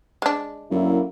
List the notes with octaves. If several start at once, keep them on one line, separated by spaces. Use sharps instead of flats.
G#3 D4
F#2 D3 A#3 E4